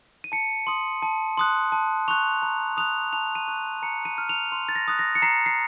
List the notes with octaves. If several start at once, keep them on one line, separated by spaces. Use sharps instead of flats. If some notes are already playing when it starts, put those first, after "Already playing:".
D#7
A5 C#7
C6 D#6
A5
C6 D#6 F#6
A5
C#6 F#6 F7
A#5
D#6 F#6 F7
A5 F7
D#7
C#6 F#6
A#5 C#7
D#7
F6
F7
C6
A6
A#6
D#6 F#6
A#6
C#7
A#5 C7
C7